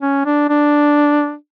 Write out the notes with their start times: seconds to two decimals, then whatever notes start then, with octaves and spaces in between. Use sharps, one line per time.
0.02 C#4
0.26 D4
0.49 D4